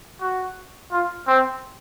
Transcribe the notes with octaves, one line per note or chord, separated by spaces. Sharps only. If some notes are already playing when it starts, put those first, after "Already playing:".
F#4
F4
C4